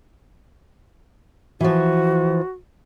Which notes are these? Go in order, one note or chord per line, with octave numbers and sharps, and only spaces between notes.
E3 F3 F#4